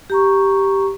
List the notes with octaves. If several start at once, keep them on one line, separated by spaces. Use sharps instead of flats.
G4 A#5 C#6